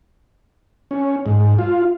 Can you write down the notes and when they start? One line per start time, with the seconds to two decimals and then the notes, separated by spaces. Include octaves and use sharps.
0.91 C#4
1.26 G#2
1.59 F4